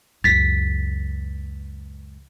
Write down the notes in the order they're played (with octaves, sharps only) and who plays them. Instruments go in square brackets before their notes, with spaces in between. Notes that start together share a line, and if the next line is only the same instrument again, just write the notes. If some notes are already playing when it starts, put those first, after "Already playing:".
[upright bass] C#2 E3 [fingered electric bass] F#2 [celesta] A6 B6